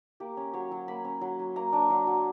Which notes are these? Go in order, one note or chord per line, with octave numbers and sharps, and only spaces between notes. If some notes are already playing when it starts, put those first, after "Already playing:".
A#3 G4
C#4
F#3 C#5
F#3
A#3 B5
C#4
F#3
F#3
A#3 A#5
D4
F#3
F#3